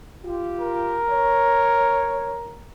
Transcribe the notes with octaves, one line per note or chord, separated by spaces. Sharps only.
F4 G4
A#4
C#5